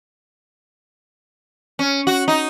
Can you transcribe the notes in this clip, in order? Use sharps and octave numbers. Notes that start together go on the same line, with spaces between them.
C#4
F#4
D#4